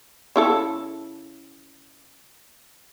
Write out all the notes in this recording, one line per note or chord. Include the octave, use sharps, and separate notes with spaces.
C#3 E4 A4